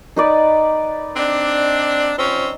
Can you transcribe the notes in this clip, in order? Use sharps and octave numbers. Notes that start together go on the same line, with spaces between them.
D#4 B4 D5
C4 D4
F3 C4 C#4